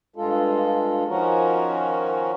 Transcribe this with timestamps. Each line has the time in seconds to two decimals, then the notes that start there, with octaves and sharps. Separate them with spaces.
0.16 G2 G#3 F4 A4
1.08 D#3 F3 C#4 F#4 A#4